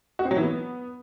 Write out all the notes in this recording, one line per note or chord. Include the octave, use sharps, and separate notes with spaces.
F#4
C4
F#3
E3
B3